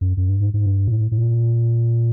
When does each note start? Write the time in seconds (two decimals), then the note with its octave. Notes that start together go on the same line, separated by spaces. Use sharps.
0.01 F#2
0.17 F#2
0.29 G2
0.40 G#2
0.54 G#2
0.66 G2
0.88 A#2
0.92 A2
1.12 A2
1.18 A#2